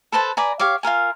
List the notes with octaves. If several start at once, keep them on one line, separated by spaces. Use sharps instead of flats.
A4 B4 C5 A5
B4 D5 G#5 A#5
G4 C#5 F5 D6
F4 A4 A#4 G#5